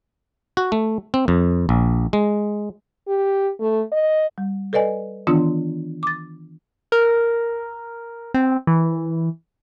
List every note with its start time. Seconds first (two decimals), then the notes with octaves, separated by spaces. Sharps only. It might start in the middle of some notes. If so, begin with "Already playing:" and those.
0.57 F#4
0.72 A3
1.14 C4
1.28 F2
1.69 A#1
2.13 G#3
3.08 G4
3.60 A3
3.92 D#5
4.38 G3
4.73 A4 B4 D5 D#5 G#5
5.27 D#3 E3 B3 D4 F4 C6
6.03 D6 A6
6.92 A#4
8.34 C4
8.67 E3